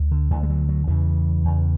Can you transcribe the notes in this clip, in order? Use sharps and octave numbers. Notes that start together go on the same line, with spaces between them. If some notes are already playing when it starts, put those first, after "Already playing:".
Already playing: D2
D3
D2 D3 E3
G#3
F#3
F#3
E2 C#3 E3
E2 C#3